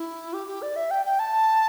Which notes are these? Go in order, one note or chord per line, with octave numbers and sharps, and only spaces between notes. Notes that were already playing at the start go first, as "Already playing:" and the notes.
Already playing: E4
G4
G4
D5
E5
G5
G5
A5